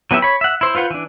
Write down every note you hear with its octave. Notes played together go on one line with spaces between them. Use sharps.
F#3 B3 E4 G4 E5
C#5 B5
E5 F#5
E4 C5
F4 B4 C5 F#5
E3 D4